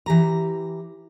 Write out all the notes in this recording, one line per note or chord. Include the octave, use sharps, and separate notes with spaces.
E3 G4 A#5